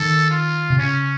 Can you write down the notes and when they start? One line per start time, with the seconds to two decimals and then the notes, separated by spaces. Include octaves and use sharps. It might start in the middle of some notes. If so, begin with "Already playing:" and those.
Already playing: D#3 A4
0.31 F4
0.70 C3
0.78 C#3 C#4